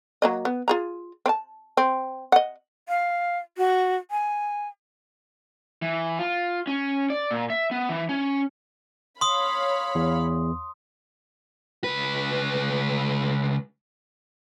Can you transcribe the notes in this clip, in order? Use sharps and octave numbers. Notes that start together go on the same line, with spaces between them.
F#3 A#3 D#5
B3
F4 G#4 A#5
C4 A5
C4
D#5 F#5
F5
F#4
G#5
E3
F4
C#4
D5
A#2
E5
B3
E3
C#4
C#5 F5 B5 C6 D#6
E2
C#2 B4